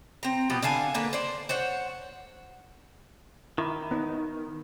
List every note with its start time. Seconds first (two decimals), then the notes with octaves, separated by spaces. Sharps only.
0.23 C4 A#5
0.50 B2 F3 G4
0.62 D3 F5 G#5 A5
0.94 D3 A#3 B4
1.13 C5 D5
1.49 C5 C#5 F#5
3.58 D#3 E4
3.91 B3 D#4